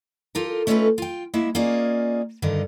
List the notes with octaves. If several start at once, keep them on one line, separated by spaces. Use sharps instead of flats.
F4 G4 A4 A#4
A3 C#4 D#4 F4 A4 B4
F4 G5
G#3 A#3 E4 E5
A#3 C#4 F4 G#4 D5 D#5
G2 D3 D#3 D#4